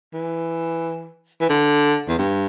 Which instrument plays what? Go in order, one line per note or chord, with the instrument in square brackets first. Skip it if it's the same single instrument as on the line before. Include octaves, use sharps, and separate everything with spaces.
[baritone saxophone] E3
E3
D3
E2
G2